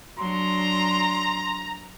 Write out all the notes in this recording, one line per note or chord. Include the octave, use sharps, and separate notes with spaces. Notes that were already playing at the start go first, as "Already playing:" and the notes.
F#3 D4 A#5 C6